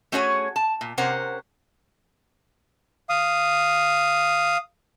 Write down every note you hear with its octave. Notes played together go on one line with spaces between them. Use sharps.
A3 C#4 F#4 G#4 C#5 G#5
A5
A#2
C3 C#4 A#4 C5 F#5
F5 D#6